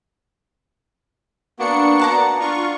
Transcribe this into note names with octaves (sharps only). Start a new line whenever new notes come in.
A#3 B3 D4 F#4 C#7
F#5 A5 A#5
D4 F4 C#6